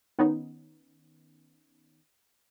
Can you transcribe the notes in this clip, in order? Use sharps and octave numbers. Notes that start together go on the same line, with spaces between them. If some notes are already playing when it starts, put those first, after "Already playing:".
D#3 B3 C#4 D#4